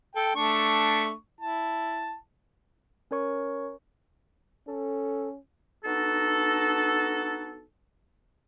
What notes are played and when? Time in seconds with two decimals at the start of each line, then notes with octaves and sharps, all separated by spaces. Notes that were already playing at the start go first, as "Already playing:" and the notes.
0.16 A4 G5
0.36 A3 D4 C#6
1.41 E4 A5
3.11 C#4 A#4 C#5 C#6
4.67 C#4 A4
5.85 B3 D4 D#4 F#4 A4